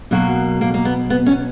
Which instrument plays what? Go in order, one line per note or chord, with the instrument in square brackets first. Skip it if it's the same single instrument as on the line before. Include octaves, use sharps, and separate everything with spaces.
[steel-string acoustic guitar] B2 F#3 A#3 F#4
A#3
A#3
B3
B3
C#4